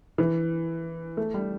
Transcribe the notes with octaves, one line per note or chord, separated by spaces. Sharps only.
E3
A3
G3